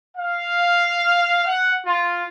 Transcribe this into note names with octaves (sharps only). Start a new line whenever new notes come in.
F5
F#5
F4